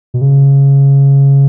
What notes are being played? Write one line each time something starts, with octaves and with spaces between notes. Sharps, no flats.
B2
C#3